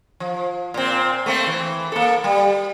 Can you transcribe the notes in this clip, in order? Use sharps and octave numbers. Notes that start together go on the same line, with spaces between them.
F3
A#2 C4
A3 A#3 C4
E3
A#3 A4
G3